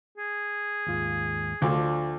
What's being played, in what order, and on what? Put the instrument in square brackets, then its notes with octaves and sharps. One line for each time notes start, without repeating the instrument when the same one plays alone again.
[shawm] G#4
[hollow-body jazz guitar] D#2 G#2 F4
[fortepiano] D2 [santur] F3 D5 [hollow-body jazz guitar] D4 A4 D#5